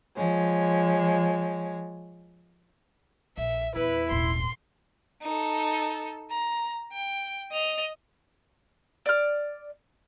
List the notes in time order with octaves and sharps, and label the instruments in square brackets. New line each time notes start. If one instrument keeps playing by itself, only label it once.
[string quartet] F3 G#3 C#5
[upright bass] A#1 [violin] E5
[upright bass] E2 [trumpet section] E4 [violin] B4
[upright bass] D#1 G#1 [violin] C6
[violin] D#4 A4
A#5
G5
D#5 F7
[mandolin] D5 F6